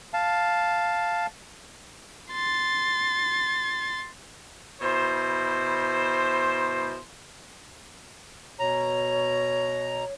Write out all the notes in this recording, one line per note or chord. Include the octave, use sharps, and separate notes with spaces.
F5 A5
C6 A6
B2 E4 C5
B2 C#5 A#5